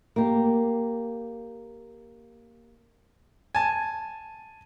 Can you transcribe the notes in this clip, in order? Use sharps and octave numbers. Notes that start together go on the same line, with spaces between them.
A#3 G4
G#5 A5